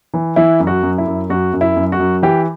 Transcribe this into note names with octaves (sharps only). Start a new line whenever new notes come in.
E3
E3 E4
F#2
F#4
F#2
E4
F#2
F#2 F#4
F#2
E4
F#2
F#4
F#2
E3 G4